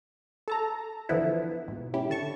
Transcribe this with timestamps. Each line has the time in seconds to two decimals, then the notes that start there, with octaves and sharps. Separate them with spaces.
0.48 A4 A5 A#5
1.09 D3 E3 F3 B3 E4
1.68 G#2 B2
1.94 C#4 E4 G4
2.10 D3 A5 C#6